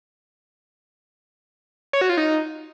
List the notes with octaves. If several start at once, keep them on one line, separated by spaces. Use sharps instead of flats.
C#5
F#4
F4
D#4